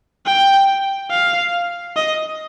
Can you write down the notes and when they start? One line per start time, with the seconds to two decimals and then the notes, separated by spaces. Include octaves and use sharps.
0.26 G5
1.11 F5
1.96 D#5